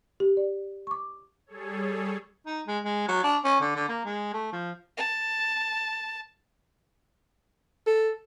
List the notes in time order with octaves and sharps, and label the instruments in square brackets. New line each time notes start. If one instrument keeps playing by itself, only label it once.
[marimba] G4
D5
C#6 D6
[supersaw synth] G3 G#4 A4 C#5
[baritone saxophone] D#4
G#3
G#3
F#3
D4
C#4
D3
D3
A#3
G#3
A3
F3
[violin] A5
[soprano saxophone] A4